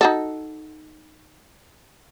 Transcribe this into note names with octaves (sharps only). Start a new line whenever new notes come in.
D#4 F#4 A4